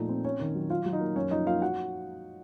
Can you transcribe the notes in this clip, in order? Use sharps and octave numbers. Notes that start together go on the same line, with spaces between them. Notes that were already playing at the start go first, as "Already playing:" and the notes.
Already playing: A#2 F3 A3 D#4
C4
C4 C#4 C#5
D#3
F#3
F4 F5
F#3
D#4 D#5
A#3
F#2 C#4 C#5
F3 D#4 D#5
A#3 F4 F5
F#4 F#5